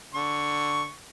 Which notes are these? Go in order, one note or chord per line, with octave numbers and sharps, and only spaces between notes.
D3 C#6